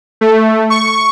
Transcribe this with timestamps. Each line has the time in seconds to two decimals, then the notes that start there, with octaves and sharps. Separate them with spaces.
0.21 A3
0.70 C#6